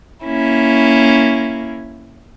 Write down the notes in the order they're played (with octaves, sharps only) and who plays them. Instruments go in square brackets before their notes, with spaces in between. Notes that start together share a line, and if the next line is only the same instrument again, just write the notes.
[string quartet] A#3 C#4 E4